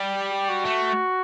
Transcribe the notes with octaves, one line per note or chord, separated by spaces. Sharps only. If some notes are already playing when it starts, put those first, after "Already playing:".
Already playing: G3
G4
G4
F#4
A3